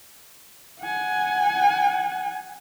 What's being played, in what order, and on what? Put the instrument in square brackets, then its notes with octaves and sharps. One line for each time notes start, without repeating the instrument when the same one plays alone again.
[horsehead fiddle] F#5 G#5